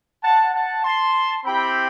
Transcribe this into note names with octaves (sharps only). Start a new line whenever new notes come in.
F#5 A5
F#5 A5
A5 C6
C4 E4 G4 G5 B5